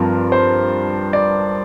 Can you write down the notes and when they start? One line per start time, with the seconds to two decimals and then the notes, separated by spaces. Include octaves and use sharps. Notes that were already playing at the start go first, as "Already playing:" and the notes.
Already playing: G2 F3 C4 A#4
0.32 C5
1.13 D5